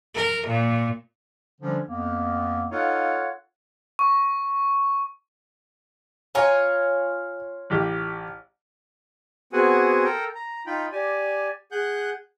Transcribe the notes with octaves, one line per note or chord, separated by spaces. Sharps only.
A#4
A#2
D3 F3 G3 C#4 D4
F2 A#3 B3
D#4 F4 A4 C#5 F5 F#5
C#6
F4 C#5 G#5 A#5
A1 G4
B3 C4 F#4 G#4 F#5 G#5
A4 A#4 G5 A#5
A#5
D#4 F4 G5 B5
G4 D5 G#5
G#4 F#5 F#6 G6